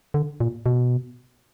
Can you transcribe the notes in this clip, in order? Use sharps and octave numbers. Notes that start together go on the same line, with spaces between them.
D3
A#2
B2